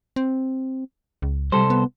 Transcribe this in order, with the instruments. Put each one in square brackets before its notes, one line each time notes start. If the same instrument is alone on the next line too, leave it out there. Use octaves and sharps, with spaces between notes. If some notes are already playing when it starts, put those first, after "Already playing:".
[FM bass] C4
C#2
[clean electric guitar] C2 A4 C5 [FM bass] G3
[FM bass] B3